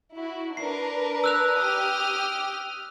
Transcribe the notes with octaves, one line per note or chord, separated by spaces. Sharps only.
E4 F#4
D4 A#4 B4 C7
E6 F#6 F7
G4 D#6 F6